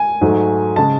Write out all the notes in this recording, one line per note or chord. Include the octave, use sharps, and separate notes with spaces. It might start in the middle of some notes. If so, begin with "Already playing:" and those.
Already playing: G#5
G#2 F#3 A3
C#3 G#3 A5